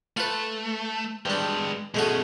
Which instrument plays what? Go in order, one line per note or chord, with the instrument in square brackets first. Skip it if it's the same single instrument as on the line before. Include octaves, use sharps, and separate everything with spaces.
[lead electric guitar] A3 [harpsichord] F4 B4
[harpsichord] G2 D4 [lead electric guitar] G#3 G5
[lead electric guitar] B2 C#4 [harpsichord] G#3 A3 F#4